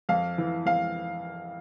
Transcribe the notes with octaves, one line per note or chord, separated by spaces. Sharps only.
F2 F5
E3
F2 F5